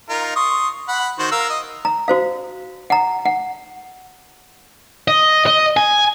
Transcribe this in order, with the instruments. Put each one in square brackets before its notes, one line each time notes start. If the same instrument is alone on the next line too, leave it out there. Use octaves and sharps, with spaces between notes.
[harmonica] D#4 F4 A#4
C6 C#6 D#6
F#5 B5
D#3 F#4 C5
A#4 F5 E6
D#5
[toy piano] A#5
F#4 C5 F5
F#5 A#5
F#5
[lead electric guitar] D#5
D#5
G#5